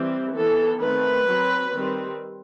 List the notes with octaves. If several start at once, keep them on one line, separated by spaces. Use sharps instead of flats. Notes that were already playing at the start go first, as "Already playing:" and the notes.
Already playing: E3 G3 C4
E3 B3 A4
D#3 A3 C4 B4
F#3 C4
D#3 G3 C4